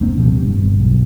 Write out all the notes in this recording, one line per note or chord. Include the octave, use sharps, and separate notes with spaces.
F#1 A#3 C4 D4
D1 B2 F3 C4
D#1 B2 G3
G2
G1
B1